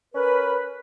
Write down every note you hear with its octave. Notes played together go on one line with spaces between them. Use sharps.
C#4 A#4 B4